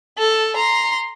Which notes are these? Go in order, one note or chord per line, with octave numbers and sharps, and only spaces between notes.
A4
A#5 C6